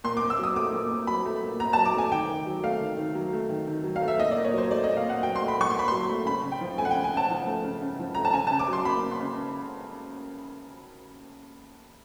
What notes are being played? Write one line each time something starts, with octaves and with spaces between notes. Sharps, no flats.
A#2 C6
A#2 D6
E6
F#3 D#6
A3 D6
A#2
A#2
F#3 B5
A3
A#2
A#2 A#5
F#3 A5
D6
A3 G#5
D#3 G5
D#3
F#3
A3 F5
D#3
D#3
F#3
A3
D#3
D#3
F#3
F5
A3
E5
A#2 D#5
D5
A#2
C#5
F#3 C5
A3 D5
A#2 D#5
F5
A#2 F#5
F#3 G5
A3 C6
B5
A#2 C#6
C6
A#2 B5
F#3 C6
A3
C#3 B5
C#3
G5
F3
A3 G#5
F#5
C#3 G5
G#5
C#3 A5
F3
A3
C#3
C#3
F3
A3 A#5
A5
C#3 G#5
C#3 A5
D6
F#3 C6
A#3 B5
C#3
C6
C#3